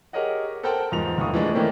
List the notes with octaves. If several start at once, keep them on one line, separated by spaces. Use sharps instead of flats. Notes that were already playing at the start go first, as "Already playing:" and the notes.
G4 G#4 A#4 C#5 D#5 F#5
A4 A#4 C5 F#5 G5 A5
E2 G#2 F3 F7
D1 D#2 D3 E4 C#6 D#6
E3 F3 G#3 A3 D4
D#3 E3 A3 A#3 C4 C#4